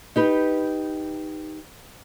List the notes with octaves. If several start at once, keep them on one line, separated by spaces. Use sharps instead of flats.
D#4 G4 B4